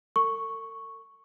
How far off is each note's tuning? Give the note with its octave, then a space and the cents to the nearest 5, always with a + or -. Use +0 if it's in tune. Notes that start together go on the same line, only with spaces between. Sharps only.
A4 +45 C#6 +0